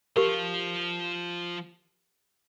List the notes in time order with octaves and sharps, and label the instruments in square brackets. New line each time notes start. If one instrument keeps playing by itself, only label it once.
[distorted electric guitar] F3 F5 [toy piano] G4 A#4